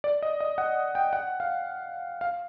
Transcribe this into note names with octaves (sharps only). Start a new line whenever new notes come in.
D5
D#5
D#5
F#5
G5
F#5
F5
F5